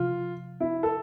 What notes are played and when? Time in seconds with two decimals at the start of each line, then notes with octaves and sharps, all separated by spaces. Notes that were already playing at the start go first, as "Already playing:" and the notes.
Already playing: C3 F3 F4
0.60 E4
0.83 A4